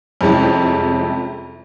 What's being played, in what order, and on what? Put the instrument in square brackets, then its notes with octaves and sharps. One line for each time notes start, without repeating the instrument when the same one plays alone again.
[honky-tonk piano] F2 C3 G3 G#3 C#4 E4